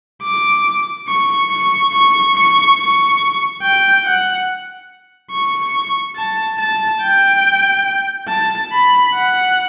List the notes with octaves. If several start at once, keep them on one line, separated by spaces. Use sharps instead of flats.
D6
C#6
C#6
C#6
C#6
C#6
G5
F#5
C#6
A5
A5
G5
A5
B5
F#5